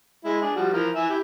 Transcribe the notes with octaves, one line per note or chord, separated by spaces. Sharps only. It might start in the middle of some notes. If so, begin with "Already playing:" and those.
G#3 E4
D4 G#4
F3 G3 F#4
E3 F3 A#4
E3 E5 G#5
E4 G4